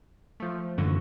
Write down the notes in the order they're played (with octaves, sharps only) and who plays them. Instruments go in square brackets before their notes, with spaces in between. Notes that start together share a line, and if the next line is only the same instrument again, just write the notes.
[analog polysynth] F3 A3
[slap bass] F#2 D3 E3 [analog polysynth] F#4